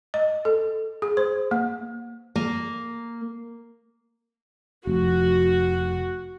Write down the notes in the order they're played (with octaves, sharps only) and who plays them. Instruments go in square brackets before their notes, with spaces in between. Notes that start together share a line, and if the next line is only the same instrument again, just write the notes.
[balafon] D#5
A4
G#4
C5
A#3
[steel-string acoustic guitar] A#3
[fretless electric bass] F1 [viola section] F#4